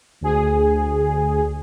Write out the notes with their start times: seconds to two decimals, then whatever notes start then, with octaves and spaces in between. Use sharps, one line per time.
0.21 D2 G#4